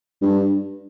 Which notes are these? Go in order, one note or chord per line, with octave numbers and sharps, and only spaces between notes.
G2